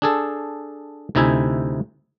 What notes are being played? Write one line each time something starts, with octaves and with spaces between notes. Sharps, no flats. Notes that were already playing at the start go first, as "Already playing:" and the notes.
D4 G#4 A4
D2 C3 D#4 E4 E5 G#5